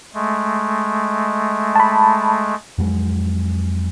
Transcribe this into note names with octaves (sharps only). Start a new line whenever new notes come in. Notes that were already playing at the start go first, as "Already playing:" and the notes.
G#3 A3
A5 B5
F2 F#3 G#3